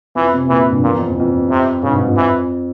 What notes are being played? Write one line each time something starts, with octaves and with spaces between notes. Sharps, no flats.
F2 E3
C3
A#2 E3
G2
E2 A#2
F2
E2
F2
C3
G2 C#3
G#2
G2
F2
E3